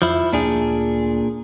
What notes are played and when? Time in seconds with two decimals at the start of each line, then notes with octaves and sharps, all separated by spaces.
0.02 F2 F3 E4
0.33 D2 A#2 D4 G#4